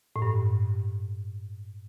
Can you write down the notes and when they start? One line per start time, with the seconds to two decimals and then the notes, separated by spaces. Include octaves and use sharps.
0.16 A2
0.22 G2